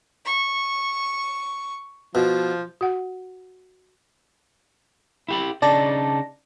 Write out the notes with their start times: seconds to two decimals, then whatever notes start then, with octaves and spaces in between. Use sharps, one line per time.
0.25 C#6
2.15 B2 F3
2.81 F#4 F#5
5.28 E4 G4 B5
5.62 C#3 D4 D#4 D5 A5